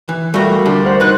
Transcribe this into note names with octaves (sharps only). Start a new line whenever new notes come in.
E3
G3 A3 F4 F#4 A#4
D2 D4 G4 C6
A#4 C5 F#5
D#4 B4 F#6